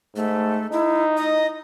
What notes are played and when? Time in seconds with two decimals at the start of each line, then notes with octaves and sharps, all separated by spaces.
0.16 G#2 A3
0.72 D#4 E4
1.17 D#5